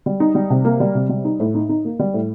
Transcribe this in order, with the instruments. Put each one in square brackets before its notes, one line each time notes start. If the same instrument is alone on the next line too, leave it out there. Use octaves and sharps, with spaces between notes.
[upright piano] G3
D#4
G3
C3
A#3
G3
C3
G3
D#4
A2
D#4
D#4
A#3
G3
A2